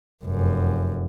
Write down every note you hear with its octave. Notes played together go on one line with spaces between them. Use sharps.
F1 F#2